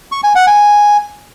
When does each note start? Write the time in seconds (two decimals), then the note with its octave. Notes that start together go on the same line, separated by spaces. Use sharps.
0.12 C#6
0.24 G#5
0.35 F#5
0.47 G#5